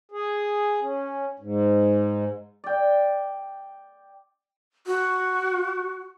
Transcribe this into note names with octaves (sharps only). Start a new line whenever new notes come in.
G#4
C#4
G#2
D5 G5
F#4